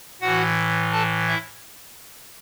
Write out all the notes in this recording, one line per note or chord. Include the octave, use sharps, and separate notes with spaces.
A2 E3 F#4 F#5
A4 A5
E4 E5